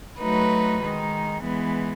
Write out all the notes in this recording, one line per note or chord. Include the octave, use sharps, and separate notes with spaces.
F#3 A3 D#4 F#4 B4
D#3 G#3 D#4
E3 G#3 B3